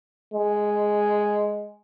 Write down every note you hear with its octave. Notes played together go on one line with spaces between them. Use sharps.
G#3